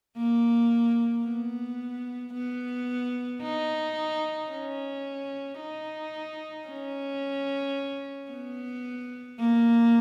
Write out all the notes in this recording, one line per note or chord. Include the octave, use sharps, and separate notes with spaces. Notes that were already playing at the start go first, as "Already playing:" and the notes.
A#3
B3
B3
D#4
C#4
D#4
C#4
B3
A#3